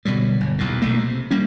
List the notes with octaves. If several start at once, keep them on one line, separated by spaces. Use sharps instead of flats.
B2 D3 F#3 G3
G1
B1 E2 A#2
B1 B2 A3 A#3
C3
G3 A#3 C#4